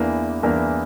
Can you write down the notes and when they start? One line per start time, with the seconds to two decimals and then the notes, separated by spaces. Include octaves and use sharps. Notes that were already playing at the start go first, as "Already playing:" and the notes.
Already playing: E2 E3 A#3 D4 E4
0.43 E2 E3 A#3 D4 A#4